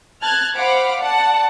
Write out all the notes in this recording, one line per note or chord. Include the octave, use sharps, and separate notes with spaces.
A5 F6 F#6 G#6 A6
C5 F5 F#5 B5 D6
D5 F#5 A5